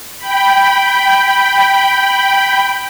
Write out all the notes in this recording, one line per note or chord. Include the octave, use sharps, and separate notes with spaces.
G5 B5